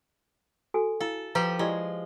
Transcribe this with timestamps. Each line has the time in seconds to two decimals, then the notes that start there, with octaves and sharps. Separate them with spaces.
0.74 F#4 A4 G#5
1.00 E4 A4 F5
1.35 F3 G4 B4 A#5
1.59 G#3 E4 G4 D5